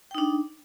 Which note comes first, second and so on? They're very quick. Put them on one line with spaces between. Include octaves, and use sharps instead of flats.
G5 D#4 D4